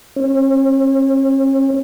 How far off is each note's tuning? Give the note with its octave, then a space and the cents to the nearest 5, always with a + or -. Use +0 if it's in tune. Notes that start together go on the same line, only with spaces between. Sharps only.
C#4 -45